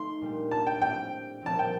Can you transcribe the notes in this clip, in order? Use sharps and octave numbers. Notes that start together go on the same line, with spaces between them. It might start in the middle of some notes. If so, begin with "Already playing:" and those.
Already playing: A3 D#4 C6
A#2 G3 D4 G4
A5
G5
A2 G3 C4 G4 G5
A#2 F3 C4 G4 A5
G5